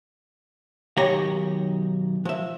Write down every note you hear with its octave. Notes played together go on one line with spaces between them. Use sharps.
B1 D#3 G4 C#5 A#5
F3 E5